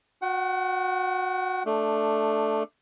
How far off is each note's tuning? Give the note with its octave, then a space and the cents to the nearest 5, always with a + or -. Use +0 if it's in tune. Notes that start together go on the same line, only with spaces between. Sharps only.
F#4 -25 F#5 +35
A3 +0 D4 +10